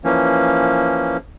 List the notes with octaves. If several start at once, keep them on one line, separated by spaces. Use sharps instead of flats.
E3 F3 A#3 C#4